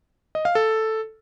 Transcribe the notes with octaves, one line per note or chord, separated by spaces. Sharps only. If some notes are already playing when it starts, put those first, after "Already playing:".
D#5
F5
A4